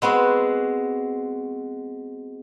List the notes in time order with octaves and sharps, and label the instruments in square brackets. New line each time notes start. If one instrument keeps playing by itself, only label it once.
[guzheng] G#3 B3 C4 F#4